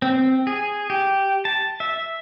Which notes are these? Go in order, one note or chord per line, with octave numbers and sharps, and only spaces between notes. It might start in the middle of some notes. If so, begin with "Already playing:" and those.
C4
G#4
G4
A5
E5